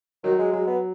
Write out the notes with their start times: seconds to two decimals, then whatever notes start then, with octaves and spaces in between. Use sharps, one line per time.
0.24 D#3 F#3
0.39 G#3
0.53 F#3 G#3
0.67 B3